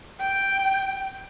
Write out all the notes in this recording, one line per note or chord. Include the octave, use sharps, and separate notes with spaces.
G5